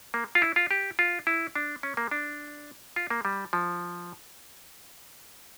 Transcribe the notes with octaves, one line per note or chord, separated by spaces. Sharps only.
A#3
F4
E4
F4
G4
F4
E4
D4
C#4
A#3
D4
F4
A#3
G3
F3